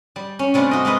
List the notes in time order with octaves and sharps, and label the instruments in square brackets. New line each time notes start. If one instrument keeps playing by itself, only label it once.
[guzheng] G3
C#4
C3 G3 A3 D4 F4
F#4 D#5
G#3 F4 B4 D#5